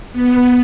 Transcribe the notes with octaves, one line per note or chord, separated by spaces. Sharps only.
B3